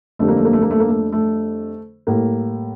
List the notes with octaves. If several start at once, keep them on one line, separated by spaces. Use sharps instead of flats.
F2 D3 G3 A3
A#3
A3
A#3
A3
A#3
A3
A#3
A3
A3
A2 G3 A#3